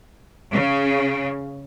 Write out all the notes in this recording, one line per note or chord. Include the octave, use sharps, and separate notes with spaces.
C#3